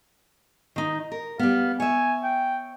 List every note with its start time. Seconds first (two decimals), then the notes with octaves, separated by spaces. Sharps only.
0.76 D#3 D#4
1.12 A#4
1.39 G3 B3 F5
1.80 C#5 E5 G#5
2.23 G5